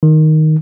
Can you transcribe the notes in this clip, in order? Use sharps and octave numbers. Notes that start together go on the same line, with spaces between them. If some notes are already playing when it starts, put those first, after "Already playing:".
D#3